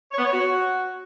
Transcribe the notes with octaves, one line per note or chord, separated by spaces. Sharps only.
C#5
B3
C#5
F#4